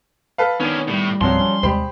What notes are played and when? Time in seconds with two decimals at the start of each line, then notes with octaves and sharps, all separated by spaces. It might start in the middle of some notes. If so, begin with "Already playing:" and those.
0.38 A4 B4 F5
0.60 D#3 B3 C#4 D4
0.88 A2 G3
1.21 C#2 G#2 F3 F#3 C4 C6
1.41 C#4
1.63 D#2 C3 G#3 G4 C5 B5